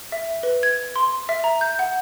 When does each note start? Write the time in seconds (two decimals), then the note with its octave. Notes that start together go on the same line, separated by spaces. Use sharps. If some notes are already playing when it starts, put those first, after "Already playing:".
0.12 E5
0.43 B4
0.63 G#6
0.96 C6
1.29 E5
1.44 A#5
1.61 G6
1.79 F#5